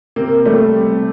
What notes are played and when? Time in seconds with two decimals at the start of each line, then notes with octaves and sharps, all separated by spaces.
0.16 C3 A#3
0.45 G3 A3
0.76 C3